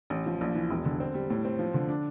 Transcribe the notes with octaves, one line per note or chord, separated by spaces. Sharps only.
A1
F3
A#1
E3
E1
D3
C4
G3
A2
C4
F3
D3
D4